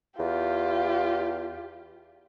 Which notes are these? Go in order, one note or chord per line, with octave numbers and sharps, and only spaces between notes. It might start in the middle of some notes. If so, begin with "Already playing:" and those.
E2 F4 G4